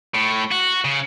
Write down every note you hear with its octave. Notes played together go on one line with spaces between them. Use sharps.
A2
F#4
C#3